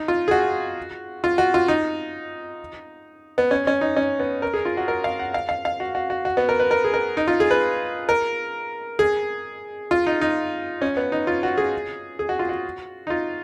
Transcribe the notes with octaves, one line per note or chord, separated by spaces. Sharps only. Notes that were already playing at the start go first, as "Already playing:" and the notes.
Already playing: D#4
F4
G#4
F#4
F4
F#4
F4
D#4
B3
C#4
C#4
D#4
C#4
B3
A#4
G#4
F4
F#4
A#4
F5
F#5
F5
F5
F5
F#4
F#4
F#4
F#4
B3
A#4
B4
A#4
G#4
A#4
D#4
F4
G#4
B4
A#4
G#4
F4
D#4
D#4
C#4
B3
D#4
F4
F#4
G#4
G#4
F#4
F4
F#4
D#4
F4